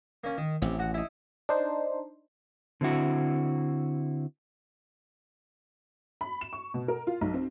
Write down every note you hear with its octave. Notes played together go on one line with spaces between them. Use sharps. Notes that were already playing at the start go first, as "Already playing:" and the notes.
A#3 C#4
D#3
A1 C3
F#4 F#5
D#4 E4
D4 D#4 C5
D3 C4 E4 F#4
B5
E7
C#6
B2
A#4
F4
B1
C4